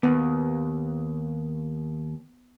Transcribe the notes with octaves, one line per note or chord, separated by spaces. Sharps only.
D#2 B3